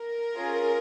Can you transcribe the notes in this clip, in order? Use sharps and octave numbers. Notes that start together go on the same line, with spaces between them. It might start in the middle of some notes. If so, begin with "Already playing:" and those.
Already playing: A#4
C#4 F4 G#4